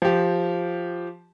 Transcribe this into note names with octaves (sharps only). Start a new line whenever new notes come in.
F3 G4